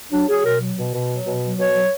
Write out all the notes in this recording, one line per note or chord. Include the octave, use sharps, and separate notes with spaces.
F#3 D4
F#3 G#4
B2 A#4
F#3
B2
B2
F#3
B2
F#3
B2 C#5
F#3